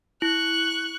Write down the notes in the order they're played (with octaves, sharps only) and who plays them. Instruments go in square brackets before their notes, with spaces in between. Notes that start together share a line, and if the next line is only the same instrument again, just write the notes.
[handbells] E4 [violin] C#6 F#6